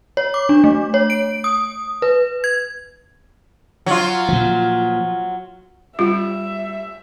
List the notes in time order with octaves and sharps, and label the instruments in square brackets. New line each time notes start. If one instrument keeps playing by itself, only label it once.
[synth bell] C#5
D6
D4
A3
C#5
D7
D#6
B4
G#6
[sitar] F#3 F4
[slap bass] A#2 F3
[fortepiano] G3 [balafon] F4 [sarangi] E5